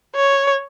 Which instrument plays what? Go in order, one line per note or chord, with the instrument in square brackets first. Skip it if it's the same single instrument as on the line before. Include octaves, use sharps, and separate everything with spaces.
[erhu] C#5